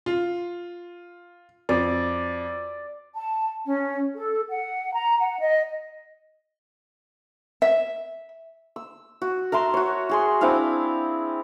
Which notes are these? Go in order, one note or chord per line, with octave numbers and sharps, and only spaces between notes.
F4
F2 D5
A5
C#4
A4
F#5
A#5
F#5
D#5
E5
E6
F#4
A#4 E5 A5 C6
F#4 C#5
F#4 G#4 C6
C4 D4 E4 F5